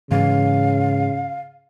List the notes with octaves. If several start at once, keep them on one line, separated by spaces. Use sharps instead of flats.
G#2 C#3 E3 F5